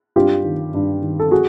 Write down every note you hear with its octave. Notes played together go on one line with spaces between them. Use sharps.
G2 F4 G4
D#3
G2
D#3
A4
F#4 G#4